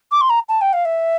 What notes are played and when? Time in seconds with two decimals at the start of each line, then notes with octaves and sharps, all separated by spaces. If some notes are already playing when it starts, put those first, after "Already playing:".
0.11 D6
0.21 C6
0.30 A#5
0.49 A5
0.61 G5
0.73 F5
0.85 E5